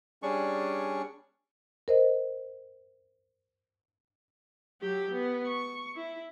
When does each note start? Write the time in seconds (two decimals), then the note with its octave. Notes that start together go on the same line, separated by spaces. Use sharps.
0.23 G3 C#4 D4 G#4 D5 C#6
1.88 A#4 C5 D#5
4.81 F#3 G4
5.11 B3
5.47 C#6
5.96 E4